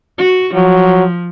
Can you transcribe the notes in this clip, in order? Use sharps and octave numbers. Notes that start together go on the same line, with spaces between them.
F#4
F3 F#3